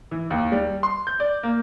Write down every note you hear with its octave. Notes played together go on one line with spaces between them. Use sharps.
E3
D#2
G3
C6
G6
D5
A#3